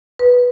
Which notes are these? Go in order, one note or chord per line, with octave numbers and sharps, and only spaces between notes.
B4